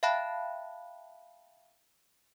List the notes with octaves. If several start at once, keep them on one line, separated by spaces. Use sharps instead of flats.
E5 F5 G5 A5 B5 F#6